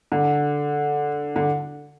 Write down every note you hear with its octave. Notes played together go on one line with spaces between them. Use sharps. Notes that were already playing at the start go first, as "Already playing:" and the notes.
D3
D3